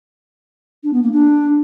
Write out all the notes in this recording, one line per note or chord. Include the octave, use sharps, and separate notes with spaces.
D4
B3
A#3
D4